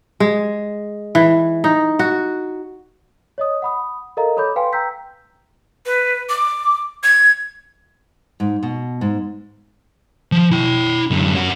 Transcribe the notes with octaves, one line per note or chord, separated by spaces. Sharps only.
G#3
E3
D#4
F#4
C#5 D#5 D#6
F#5 B5 D#6
A4 A#4 D#5 F5 A#5
A4 C#5 B5 D6 G6
B4 F5 G5 G#5 C6
G5 A#5 E6 G6 B6
B4
D6
G#6
G#2
B2
G#2
F3
E4 G5
F#2 D3
C#4 F#4